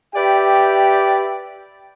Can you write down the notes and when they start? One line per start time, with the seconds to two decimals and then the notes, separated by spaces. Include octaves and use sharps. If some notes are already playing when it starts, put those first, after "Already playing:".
0.15 G4 B4 D5 E5 G5